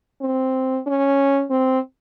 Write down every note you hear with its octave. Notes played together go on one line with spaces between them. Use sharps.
C4
C#4
C4